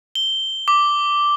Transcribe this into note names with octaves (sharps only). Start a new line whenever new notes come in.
G7
D6